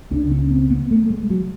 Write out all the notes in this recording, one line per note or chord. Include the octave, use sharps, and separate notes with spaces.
C#2 C#3 D4
C#4
C4
B3
A3
G#3
F#3